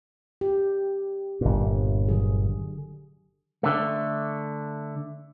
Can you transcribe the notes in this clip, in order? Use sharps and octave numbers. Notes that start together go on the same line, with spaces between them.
G4
G1 A#2
D3 F#3 G#4
D3 A3